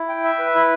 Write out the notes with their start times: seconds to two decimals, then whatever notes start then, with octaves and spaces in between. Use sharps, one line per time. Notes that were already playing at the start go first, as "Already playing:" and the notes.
Already playing: E4
0.09 G5
0.24 E5
0.39 B4
0.55 E4